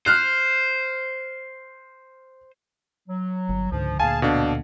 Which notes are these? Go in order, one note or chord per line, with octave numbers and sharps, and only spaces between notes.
C5 F6 F#6
F#3
G1
C#2 G#2 D3 F3
D2 A#2 G#4 F5 G#5 A5
B2 D4 A4 F5